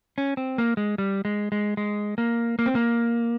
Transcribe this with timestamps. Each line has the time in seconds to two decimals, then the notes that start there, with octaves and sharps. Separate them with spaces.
0.18 C#4
0.37 C4
0.58 A#3
0.77 G#3
0.98 G3
1.25 G#3
1.52 G#3
1.77 G#3
2.18 A#3
2.59 A#3
2.66 C4
2.75 A#3